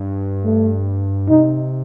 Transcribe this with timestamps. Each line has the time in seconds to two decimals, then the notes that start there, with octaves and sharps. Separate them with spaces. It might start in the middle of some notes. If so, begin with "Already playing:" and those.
Already playing: G2
0.45 A3
1.30 C3 D#4